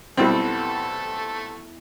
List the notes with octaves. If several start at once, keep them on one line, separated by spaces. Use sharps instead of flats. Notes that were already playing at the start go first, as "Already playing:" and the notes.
B1 G3 A3 B3 C4 E4 A4 F#5